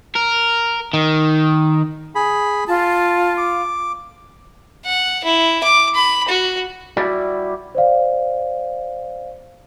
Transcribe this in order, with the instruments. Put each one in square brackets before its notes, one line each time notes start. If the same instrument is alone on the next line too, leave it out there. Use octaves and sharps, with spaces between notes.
[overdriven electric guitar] A#4
D#3
[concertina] G#4 B5
[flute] F4 [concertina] A5
[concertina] D6
[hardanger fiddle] F#5
E4
D6
B5
F#4
[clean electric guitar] G3 E4 F#4 D5
[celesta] C5 D5 F5